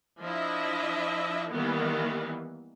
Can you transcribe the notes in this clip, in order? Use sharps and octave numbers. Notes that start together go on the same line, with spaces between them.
F3 D4 E4 D#5 E5
D#3 E3 G3 A#3 B3